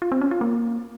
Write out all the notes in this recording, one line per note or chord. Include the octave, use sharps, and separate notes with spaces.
F4
C4
C#4
F4
A#3